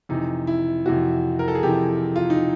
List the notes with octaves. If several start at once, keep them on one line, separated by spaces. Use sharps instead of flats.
F2 C3 E3 D#4
E4
F2 C3 E3 F#4
A#4
A4
G#4
F2 C3 E3 G4
F4
D#4